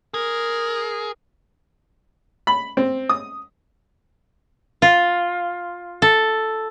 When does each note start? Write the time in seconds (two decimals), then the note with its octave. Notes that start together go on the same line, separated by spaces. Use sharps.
0.14 G#4 A#4
2.47 B5
2.77 C4
3.09 D#6
4.82 F4
6.02 A4